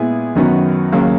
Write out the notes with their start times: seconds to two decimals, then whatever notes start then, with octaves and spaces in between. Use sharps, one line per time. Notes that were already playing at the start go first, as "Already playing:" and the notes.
Already playing: A#2 G#3 B3 E4 G#4
0.36 F#2 D#3 F#3 B3 F#4
0.92 D#2 C#3 F#3 A#3